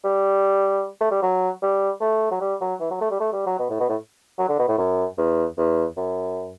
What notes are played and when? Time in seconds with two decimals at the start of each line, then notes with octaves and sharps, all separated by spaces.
0.04 G3
1.01 A3
1.11 G3
1.22 F#3
1.63 G3
2.01 A3
2.31 F#3
2.41 G3
2.61 F#3
2.80 E3
2.91 F#3
3.01 A3
3.11 G3
3.20 A3
3.33 G3
3.46 F#3
3.59 B2
3.70 A2
3.80 B2
3.89 A2
4.38 F#3
4.49 D3
4.59 B2
4.68 A2
4.78 F#2
5.18 E2
5.58 E2
5.97 F#2